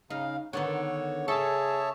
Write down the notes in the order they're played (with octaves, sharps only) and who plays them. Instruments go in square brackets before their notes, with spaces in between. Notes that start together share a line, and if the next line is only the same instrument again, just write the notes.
[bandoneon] C#3 F5 [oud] D#4
[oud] D3 D#3 B3 [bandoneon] C#5
[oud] C#3 A4 [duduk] G#4 [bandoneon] C#5 E5 A5